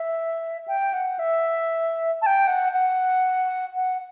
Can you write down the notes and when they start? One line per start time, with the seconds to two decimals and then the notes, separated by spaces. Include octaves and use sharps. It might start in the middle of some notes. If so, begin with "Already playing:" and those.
Already playing: E5
0.68 G5
0.93 F#5
1.19 E5
2.22 A5
2.26 G5
2.47 F#5
2.73 F#5
3.76 F#5